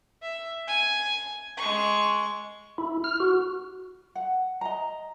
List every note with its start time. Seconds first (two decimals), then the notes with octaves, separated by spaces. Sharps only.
0.22 E5
0.67 G#5
1.57 G#3 C#6
2.78 E4
3.04 F6
3.20 F#4
4.15 F#5
4.61 D#5 A#5